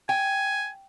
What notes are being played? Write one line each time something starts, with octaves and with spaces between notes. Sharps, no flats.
G5 G#5